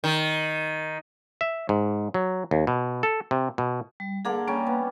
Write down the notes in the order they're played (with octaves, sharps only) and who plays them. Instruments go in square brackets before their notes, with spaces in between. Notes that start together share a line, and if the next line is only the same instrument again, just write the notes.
[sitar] D#3
[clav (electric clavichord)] E5
G#2
F#3
D#2
B2
A4
C3
B2
[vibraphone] G3
[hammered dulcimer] D3 A#3 A#5 [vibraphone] G#4 F#5
[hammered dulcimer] G3 C#4 [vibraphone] A#3
[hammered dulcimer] B3